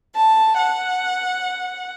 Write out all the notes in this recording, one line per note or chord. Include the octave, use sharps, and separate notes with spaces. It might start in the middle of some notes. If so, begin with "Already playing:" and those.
A5
F#5